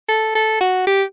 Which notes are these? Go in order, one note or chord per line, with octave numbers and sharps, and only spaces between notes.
A4
A4
F#4
G4